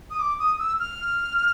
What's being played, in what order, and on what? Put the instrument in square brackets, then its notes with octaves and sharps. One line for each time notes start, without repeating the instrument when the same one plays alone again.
[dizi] D#6
D6
D#6
E6
F6